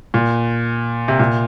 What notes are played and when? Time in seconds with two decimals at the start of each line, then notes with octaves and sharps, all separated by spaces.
0.14 A#2
1.08 C3
1.19 A#2